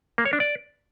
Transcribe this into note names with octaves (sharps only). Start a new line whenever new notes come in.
A#3
C#5
D4
D5